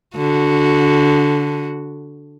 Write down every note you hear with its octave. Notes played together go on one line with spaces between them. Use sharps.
D3 F#4